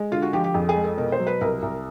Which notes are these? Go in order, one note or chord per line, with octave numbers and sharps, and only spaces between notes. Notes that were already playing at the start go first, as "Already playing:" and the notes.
Already playing: G#3
D3 F4
F#4
F3 G4
G4
F2 G#4
G#4
G#3
A4
B2 A#4
C5
F#3
B4
C2 A#4
C2